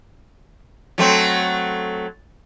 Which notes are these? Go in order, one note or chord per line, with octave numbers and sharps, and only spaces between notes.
F#3 A3 C4